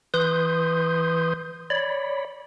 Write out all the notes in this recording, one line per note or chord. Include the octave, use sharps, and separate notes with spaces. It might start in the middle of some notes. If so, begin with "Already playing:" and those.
E3 B4 C6 D#6 G6
C#5 D5 B5